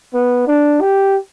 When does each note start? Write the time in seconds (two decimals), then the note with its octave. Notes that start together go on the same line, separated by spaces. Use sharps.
0.14 B3
0.47 D4
0.81 G4